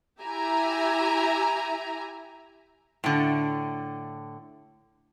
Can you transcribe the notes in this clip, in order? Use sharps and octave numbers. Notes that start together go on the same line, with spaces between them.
E4 G4 E5 G#5 A#5
A2 D3